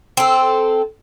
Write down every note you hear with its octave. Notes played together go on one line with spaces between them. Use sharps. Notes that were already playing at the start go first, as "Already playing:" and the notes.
C4 A4